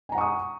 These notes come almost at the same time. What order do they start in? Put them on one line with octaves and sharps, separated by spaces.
G#5 A#5 F#5 C#6 D#6